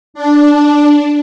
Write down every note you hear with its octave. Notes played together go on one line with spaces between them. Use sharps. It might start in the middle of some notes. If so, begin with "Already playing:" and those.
D4